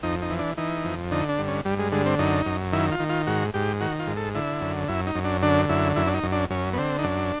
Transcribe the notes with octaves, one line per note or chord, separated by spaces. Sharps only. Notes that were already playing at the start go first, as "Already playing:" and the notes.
F2 D#4
D#4
E3
D4
E3 D#4
F2
D3 D#4
D4
G2
C#4
G2 G3
G#3
D3 G#3
C4
F#2 D#4
F#2
D#3 E4
F4
D#3
F4
G#2 F#4
G#2 G4
D#3 F#4
F4
G#2
A4
D3 E4
F#2
F#2 E4
D#4
F#2
D4
D3 D4
F#2 E4
F#2 E4
D4
D#4
F#2
D4
F#2 C#4
B3
D3 C4
D#4
F#2 D4